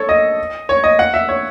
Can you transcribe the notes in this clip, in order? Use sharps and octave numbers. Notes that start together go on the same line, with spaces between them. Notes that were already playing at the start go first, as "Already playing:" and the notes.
Already playing: A4 C#5
D#5
C#5
D#5
F#5
E5
C#5